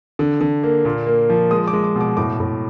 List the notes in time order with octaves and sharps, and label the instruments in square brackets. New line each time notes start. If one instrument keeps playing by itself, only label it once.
[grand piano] D3
D3
A#3
A#2
A#3
F3
G#3 D#6
D6
G#3
D6
B2
D6
A2 D6
A2